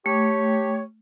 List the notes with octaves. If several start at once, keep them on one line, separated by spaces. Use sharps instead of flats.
A3 G4 C#5